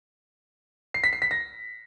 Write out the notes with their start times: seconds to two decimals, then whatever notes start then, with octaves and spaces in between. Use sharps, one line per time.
0.94 C7
1.04 B6
1.13 C7
1.22 B6
1.31 A#6